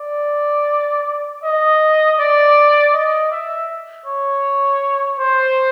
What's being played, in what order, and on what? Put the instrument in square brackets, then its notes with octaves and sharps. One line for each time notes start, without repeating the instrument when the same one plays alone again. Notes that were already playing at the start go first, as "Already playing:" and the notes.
Already playing: [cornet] D5
D#5
D5
D#5
E5
C#5
C5